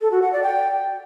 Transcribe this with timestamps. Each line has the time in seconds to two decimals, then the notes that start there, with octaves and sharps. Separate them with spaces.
0.01 A4
0.11 F#4
0.22 F#5
0.33 D5
0.43 G5